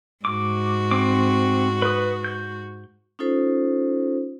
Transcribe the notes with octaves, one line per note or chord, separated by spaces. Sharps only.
G#2 F#4 D6
C4 D6
B4 D#6
G6
C#4 D#4 F4 A4 C5